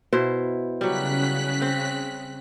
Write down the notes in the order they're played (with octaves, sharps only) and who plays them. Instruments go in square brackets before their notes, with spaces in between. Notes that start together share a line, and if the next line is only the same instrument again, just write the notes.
[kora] B2 E4 C5
[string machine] C#3 F#6 B6 [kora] F#3 G3
[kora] C4